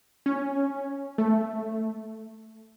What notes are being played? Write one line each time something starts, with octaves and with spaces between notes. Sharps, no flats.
C#4
A3